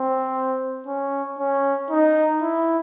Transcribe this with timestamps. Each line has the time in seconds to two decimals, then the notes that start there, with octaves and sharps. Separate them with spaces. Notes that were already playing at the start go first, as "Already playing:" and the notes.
Already playing: C4
0.87 C#4
1.39 C#4
1.91 D#4
2.42 E4